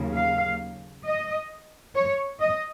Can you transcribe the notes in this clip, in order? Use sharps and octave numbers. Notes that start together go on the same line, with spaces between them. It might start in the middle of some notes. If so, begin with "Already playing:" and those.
Already playing: D#2 C#3 F#3 A#3
F5
D#5
C#5
D#5